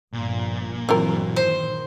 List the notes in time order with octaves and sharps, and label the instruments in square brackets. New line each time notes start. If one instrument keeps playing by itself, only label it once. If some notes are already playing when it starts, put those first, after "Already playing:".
[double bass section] G1 F3 [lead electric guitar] A#2
[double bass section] G2 E3 F#3 [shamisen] C4 F4 A#4
[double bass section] D#3 [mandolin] C5